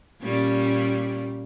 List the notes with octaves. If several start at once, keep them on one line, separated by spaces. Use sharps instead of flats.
A#2 G3 C#4